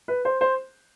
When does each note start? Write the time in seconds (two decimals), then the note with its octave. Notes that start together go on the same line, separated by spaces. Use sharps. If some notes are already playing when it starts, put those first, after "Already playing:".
0.08 B4
0.25 C5
0.41 C5